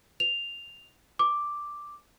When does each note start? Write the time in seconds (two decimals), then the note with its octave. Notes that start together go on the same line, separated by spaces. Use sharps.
0.20 F7
1.19 D6